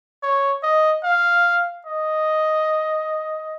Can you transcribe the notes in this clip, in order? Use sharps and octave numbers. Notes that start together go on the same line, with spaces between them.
C#5
D#5
F5
D#5